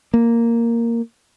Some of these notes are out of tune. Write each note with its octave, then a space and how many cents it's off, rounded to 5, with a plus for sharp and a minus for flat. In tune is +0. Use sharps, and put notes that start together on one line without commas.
A#3 -5